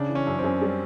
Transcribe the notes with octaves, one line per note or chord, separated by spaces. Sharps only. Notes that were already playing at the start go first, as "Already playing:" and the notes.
Already playing: C#3 D4
E3
C#4
F#2
C4
F#2
G3